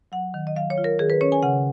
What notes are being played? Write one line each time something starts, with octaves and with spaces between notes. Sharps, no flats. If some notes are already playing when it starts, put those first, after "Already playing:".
F#3 F#5
D#3
D#5
F#3 F5
C#5
F4
A#4
D#3 G#4
B4
C#4 C#5
G#5
C#3 F#5